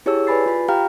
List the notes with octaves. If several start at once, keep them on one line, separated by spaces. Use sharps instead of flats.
E4 G4 G#4 C#5 A5 E6
B4 D5 G#5 B5 A6 C7
F4 B5
G4 F5 G5 A#5 F6